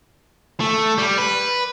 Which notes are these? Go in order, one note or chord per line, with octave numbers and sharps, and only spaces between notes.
A3
G3
B4